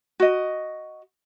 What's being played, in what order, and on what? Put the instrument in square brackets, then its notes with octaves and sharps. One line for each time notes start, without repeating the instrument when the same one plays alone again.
[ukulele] F#4 D#5